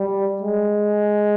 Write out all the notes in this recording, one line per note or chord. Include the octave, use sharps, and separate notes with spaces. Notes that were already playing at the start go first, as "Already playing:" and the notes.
Already playing: G3
G#3